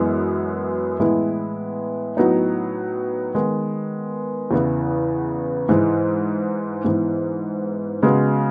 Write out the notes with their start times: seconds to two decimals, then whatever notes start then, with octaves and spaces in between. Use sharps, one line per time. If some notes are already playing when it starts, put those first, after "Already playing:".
Already playing: F#2 E3 G#3 B3
1.00 A2 E3 G#3 B3 E4
2.17 A2 F#3 B3 D#4
3.35 D#3 G#3 B3
4.51 E2 C#3 E3 B3
5.69 G#2 E3 G#3
6.85 G#2 E3 B3
8.02 C#3 G#3 B3 F#4